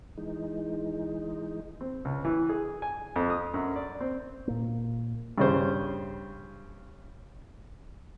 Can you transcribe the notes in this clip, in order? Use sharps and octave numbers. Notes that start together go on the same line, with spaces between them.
E3 G#3 D#4
C4
C#2
E3
G#4
G#5
F2
D#6
F#2
D5
C4
A#2 A#3
G2 C#3 C5